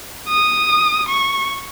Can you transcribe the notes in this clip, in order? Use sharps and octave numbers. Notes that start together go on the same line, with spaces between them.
D#6
C#6